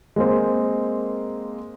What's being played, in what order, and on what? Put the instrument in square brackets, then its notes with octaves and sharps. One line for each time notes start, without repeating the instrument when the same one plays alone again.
[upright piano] G#3 A#3 C4